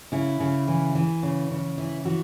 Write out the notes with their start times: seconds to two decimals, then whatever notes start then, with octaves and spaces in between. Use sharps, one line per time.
0.12 C#3 E4
0.40 C#3
0.67 E3
0.95 E3
1.23 C#3
1.51 C#3
1.78 E3 E4
2.05 E3 F#4